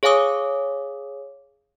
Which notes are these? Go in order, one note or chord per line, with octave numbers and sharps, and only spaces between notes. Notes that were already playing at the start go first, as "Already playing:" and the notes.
G#4 C#5 F5 G#5 D6 D#6